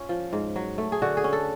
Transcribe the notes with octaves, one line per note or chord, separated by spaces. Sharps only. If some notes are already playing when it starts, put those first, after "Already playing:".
Already playing: C#4 F4
F3
G#2
F#3
A3
G#4
D3 F#4
G#4
C#4
A4